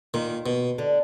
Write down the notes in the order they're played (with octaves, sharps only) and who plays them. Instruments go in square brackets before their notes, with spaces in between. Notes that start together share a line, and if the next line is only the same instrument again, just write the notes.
[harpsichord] A#2 [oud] D#3
[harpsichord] B2
[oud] D3